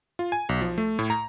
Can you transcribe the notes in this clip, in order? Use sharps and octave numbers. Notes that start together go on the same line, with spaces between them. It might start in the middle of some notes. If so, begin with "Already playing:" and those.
F4
G#5
B1
F3
A3
A2
A#5